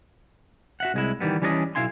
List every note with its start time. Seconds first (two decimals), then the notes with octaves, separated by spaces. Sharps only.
0.80 F#4 E5 F#5
0.94 C2 G#3 E4
1.20 D#3 E3 G3 B3
1.42 E3 G3 C#4 D4 G#4 D#5
1.75 B1 E2 E4 F5 G#5 C6